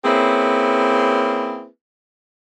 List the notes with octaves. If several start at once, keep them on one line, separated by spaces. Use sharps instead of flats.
A#3 C4 C#4 E4 G#4 B4